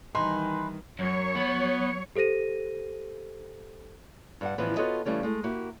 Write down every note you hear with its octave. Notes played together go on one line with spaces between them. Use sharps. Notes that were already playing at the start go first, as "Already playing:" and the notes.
D#3 E3 G3 D#4 B4 G#5 C6
F#2 F#3 C#5
B3
G4 A4 C5 A#6 D#7
G2 G3 F#5
A2 E3 F3 G3 B3 C#4
B3 F4 F#4 A4 C#5 D#5
C#3 E3 G3 A3 C#4
G#3 A3
A#3 E4 F#4 G4